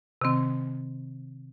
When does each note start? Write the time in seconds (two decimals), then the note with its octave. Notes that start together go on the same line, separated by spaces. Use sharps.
0.21 C3 D#3 C4